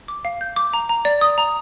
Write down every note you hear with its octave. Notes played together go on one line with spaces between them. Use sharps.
D6
F5
G6
D6
A#5
A#5
D5
D#6
A#5